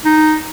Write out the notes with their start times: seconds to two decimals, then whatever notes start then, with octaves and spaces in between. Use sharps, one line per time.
0.05 D#4